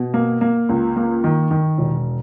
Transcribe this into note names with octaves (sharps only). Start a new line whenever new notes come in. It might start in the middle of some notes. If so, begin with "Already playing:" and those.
Already playing: B2
A#3
A#3
C#2
A#3
D#3
D#3
E1